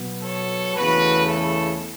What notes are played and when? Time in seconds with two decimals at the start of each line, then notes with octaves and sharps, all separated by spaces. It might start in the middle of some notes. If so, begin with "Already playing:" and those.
Already playing: B2 F#3 B3
0.23 A4 C#5
0.75 E2 C#3 A3 F#4 B4
1.27 E4 A4